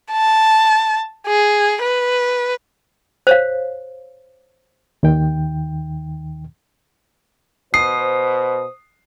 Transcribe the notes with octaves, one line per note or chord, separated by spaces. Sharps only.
A5
G#4
B4
C5 C#5 F5
D#2 D#3 G5
B2 C5 D#6 C7